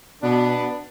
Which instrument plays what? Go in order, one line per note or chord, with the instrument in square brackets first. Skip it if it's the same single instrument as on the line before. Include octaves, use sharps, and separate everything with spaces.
[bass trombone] B2 [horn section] B3 D4